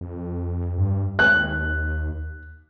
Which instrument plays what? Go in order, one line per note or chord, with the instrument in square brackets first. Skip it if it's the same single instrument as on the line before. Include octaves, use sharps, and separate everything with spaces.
[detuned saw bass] F2
G2
[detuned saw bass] D#2 [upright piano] F#6